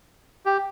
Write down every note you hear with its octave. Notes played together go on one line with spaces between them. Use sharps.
G4